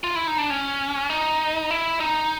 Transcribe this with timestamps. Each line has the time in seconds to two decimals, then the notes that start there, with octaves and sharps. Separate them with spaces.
0.04 F4
0.15 E4
0.27 D#4
0.38 D4
0.50 C#4
1.10 D#4
1.71 E4
2.00 D#4